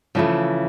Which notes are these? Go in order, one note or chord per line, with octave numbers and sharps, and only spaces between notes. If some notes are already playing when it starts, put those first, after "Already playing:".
C#3 E3 F3 A3